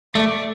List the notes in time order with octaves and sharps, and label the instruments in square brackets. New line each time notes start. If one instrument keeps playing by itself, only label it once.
[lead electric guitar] A3 [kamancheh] D5